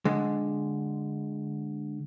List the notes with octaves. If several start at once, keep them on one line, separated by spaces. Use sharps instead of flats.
D3 G#3